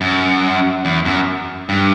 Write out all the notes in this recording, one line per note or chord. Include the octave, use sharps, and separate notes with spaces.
F#2
E2
F#2
G2